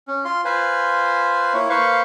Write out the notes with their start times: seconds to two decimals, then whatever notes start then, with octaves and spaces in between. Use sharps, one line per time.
0.08 C#4
0.25 F4 C6
0.45 F4 B4 C5 G#5
1.53 A#3 E4 C#5
1.70 A#3 B4 C5 F5 C#6